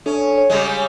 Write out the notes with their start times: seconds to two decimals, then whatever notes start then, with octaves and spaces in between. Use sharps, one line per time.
0.06 C#4 D4 A4 E5
0.38 C#5
0.50 C#3 G3 G#3